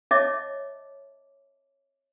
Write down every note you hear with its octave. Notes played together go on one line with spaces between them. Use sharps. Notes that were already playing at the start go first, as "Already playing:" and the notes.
C#5 D#5 E5 A5 D6